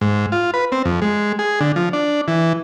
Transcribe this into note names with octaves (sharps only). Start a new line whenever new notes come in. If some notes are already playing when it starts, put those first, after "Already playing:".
G#2
F4
B4
C4
F2
G#3
G#4
D3
F3
D4
E3